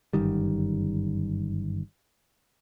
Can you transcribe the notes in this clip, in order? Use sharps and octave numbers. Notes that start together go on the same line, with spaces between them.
G1 F#2 D#3 G3